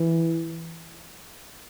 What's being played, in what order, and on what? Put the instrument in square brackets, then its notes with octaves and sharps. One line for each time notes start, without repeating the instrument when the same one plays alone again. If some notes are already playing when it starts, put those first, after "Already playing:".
Already playing: [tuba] E3